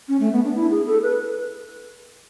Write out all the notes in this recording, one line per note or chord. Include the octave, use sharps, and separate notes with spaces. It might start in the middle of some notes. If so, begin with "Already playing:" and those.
C#4
A3
B3
D4
E4
G#4
A4
B4